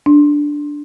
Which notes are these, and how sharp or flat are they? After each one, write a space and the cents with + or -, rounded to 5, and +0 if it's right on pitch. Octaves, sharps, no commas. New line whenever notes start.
D4 -5